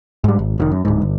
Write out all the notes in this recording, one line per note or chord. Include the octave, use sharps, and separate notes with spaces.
G#2 G3
G#1
F1 B2 D#3
F#2
D1 G#2
G1